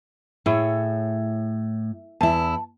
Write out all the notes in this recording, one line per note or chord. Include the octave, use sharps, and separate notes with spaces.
A2 E4 G#4 C#5
E2 E4 A5